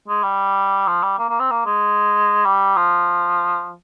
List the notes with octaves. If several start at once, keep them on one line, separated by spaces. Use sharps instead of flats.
G#3
G3
F3
G3
A#3
A#3
C4
A#3
G#3
G3
F3